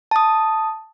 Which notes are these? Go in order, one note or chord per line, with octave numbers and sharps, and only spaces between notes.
A5 D#6